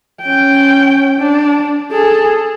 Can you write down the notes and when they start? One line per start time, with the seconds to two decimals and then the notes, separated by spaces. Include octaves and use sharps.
0.22 C#4 G5
1.19 D4
1.92 G#4 A4